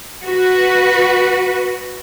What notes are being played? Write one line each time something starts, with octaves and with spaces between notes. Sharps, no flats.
F#4 B4